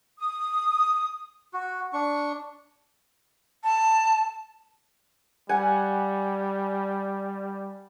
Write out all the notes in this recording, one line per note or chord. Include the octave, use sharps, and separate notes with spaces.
D#6
F#4
D4 C#6
A5
G3 F#5 G#5